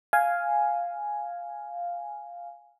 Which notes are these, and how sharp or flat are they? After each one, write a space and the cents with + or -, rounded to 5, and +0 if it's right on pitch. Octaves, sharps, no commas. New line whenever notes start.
F5 +0 G#5 +0